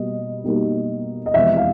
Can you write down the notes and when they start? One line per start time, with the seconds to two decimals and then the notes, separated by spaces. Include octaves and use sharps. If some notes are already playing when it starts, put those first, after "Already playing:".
Already playing: B2 G3 A#3 D#5
0.44 B2 G3 A#3 D#4
1.26 D#5
1.34 F2 C3 E3 G#3 B3 E5
1.57 F5